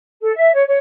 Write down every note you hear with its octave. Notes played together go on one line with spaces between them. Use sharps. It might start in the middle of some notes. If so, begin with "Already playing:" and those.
A4
E5
C#5
C#5